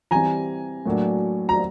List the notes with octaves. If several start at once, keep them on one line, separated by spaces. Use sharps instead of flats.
E3 G3 C4 G#5 A#5
A2 F#3 A#3 D4
A#5